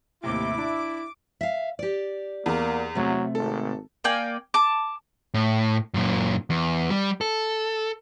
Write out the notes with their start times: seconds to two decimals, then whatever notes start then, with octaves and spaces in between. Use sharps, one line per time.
0.24 D#2 A2 C3 E4 D6
0.58 D4
1.41 E5 F5
1.79 G4 D5
2.46 E2 A#3
2.95 C3 F#3 A3
3.35 G#1 A4
4.04 A#3 D5 G5 G#5
4.54 A5 D6
5.34 A2
5.94 F#2 A#2
6.50 E2
6.90 G3
7.21 A4